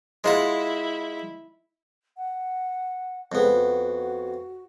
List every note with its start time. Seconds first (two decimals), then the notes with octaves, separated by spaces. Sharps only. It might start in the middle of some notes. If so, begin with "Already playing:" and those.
0.24 G#3 E4 F4 F#5
2.17 F#5
3.32 F2 G#3 B3
3.52 F#4